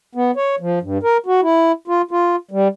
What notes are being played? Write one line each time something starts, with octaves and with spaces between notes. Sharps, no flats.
B3
C#5
F3
G2
A#4
F#4
E4
F4
F4
G3